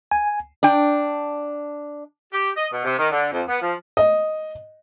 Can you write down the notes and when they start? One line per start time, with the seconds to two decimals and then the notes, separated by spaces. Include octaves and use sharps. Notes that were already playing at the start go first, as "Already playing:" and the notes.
0.11 G#5
0.63 D4 G5
2.33 G4
2.56 D#5
2.72 B2
2.84 C3
2.98 D#3
3.11 D3
3.32 F2
3.47 B3
3.62 F3
3.97 D#5